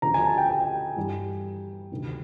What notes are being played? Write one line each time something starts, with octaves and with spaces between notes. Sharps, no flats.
D2 C#3 F3 A#5
G#5
A5
G5
G5
G2 E3 G3
D2 C3 D#3 G3